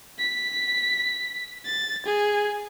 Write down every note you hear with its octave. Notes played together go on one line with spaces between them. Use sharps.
B6
A6
G#4